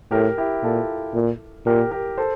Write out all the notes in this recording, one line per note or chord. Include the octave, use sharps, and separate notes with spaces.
A2 G4 A#4
E4 G4
A#2 F4 A4
A#2
A#2 G4 A#4
G4 A#4
A4 C5